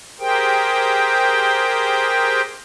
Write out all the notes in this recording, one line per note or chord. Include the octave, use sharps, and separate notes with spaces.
G4 G#4 A#4 C5 G5